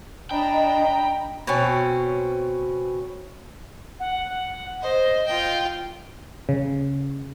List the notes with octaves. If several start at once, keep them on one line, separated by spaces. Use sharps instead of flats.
D4 D#5 G5 A#5 B5
B2 C4 C#4
F#5
C5 D#5
F4 G5
C#3